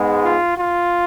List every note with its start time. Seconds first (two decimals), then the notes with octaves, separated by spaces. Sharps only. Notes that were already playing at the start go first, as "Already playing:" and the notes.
Already playing: G#2 G#3 B3
0.23 F4
0.57 F4